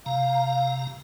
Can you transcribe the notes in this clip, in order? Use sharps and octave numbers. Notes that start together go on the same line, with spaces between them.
C3 F5 A#5